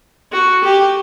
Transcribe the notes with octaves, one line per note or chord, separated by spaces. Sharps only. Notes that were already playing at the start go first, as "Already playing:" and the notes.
F#4
G4